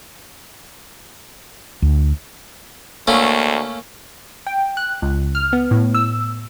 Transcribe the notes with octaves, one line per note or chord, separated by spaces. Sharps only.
D2
D2 A3 A#3 C#4
G5
F#6
C#2
F6
B3
A2
E6